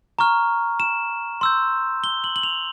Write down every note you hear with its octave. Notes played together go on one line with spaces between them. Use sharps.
A#5 C#6 F6
E7
C6 E6 G6
G7
F#7
F#7
F7